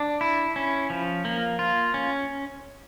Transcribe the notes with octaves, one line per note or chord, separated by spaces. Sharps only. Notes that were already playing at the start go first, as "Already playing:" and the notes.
Already playing: D4
E4
C#4
F3
A#3
F4
C#4